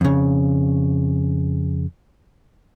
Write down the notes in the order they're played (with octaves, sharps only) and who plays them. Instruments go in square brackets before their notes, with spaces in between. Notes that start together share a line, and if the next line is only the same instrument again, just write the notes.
[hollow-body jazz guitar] F2 C#3